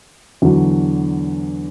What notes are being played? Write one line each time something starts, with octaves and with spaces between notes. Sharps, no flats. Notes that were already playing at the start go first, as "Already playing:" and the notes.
E2 D3 F#3